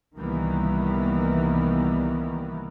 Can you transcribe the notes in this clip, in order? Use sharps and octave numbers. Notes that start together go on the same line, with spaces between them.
C2 D#3 E3 G3 A#3 B3